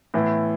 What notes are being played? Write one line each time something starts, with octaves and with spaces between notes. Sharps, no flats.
A2 E3 B3 E4